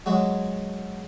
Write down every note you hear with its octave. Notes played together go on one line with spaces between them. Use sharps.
F#3 G#3 F#4